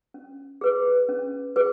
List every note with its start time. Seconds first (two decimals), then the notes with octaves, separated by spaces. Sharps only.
0.14 C#4
0.61 G#4 B4
1.09 C#4
1.56 G#4 B4